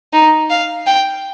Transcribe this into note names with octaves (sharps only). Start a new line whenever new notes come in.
D#4
F5
G5